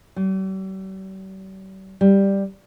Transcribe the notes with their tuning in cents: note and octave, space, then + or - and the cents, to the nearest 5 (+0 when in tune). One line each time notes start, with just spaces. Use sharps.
G3 -45
G3 +5